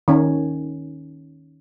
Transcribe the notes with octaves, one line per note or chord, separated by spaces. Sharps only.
D#3 C#4